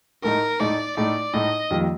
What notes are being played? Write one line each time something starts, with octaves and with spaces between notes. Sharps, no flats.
A2 A3 D#4 A#4
A2 A3 D#4 D5
A2 A3 D#4 D5
A2 A3 D#4 D#5
F2 D#3 G3 A#3